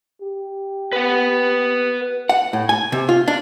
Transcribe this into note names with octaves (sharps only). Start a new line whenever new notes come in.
G4
B4 F#5
F#5
A2
G#5
C3
F4
D4